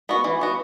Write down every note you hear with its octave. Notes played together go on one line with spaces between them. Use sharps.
B3 F#4
E3
B3 F#4